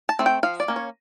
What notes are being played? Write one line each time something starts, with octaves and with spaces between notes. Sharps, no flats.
A5
A3 C4
G5
F3 F5
D5
A#3 C#4
C#5